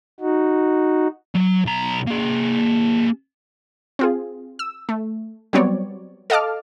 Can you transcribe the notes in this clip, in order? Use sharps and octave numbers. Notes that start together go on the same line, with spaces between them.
D#4 F#4
F#3
B1 A#5
A#3 G#4
C4 F4 G#4
E6
A3
F#3 G3 B3 C4 C#5 D5
A4 D#5 F5 A5 D6 F6